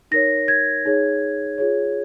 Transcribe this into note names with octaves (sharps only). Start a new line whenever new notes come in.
D#4 A#4 C#5 A#6
G#6
D#4 G#4 C#5
F4 G#4 C#5